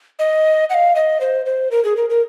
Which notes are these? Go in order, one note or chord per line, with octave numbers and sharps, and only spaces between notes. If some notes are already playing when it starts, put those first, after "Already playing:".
D#5
F#5
F5
D#5
C5
C5
A#4
G#4
A#4
A#4